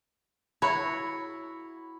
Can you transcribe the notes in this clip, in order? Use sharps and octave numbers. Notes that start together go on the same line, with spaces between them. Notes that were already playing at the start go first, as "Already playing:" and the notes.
E4 F#4 C#5 B5